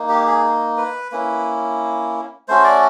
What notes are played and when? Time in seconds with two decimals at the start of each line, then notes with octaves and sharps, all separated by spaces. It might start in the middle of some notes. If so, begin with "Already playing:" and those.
Already playing: A#3 D#4
0.09 G4
0.27 G#4
0.77 B4
1.12 A#3 C#4 E4 B4
2.48 A3 C#4 F#4 C5
2.64 D5